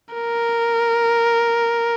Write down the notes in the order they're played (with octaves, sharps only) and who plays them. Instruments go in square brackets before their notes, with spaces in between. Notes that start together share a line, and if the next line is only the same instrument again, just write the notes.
[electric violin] A#4